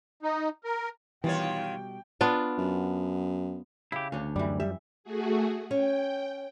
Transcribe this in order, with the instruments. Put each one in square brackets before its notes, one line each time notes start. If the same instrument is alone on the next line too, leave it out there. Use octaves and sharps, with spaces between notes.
[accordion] D#4
A#4
[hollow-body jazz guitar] B2 G3 [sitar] D#3 F4 C#5 [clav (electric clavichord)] E3 [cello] G5
[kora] B3 D4 F4
[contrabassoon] F#2
[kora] C#3 [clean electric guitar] E4 G4
[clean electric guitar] D2 [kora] C#4 D4
[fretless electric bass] F#2 [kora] E3 G3 [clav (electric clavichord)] D5
[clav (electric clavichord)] G3 [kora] E5
[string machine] A3 F#4 G#4
[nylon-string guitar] C#4 [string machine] G5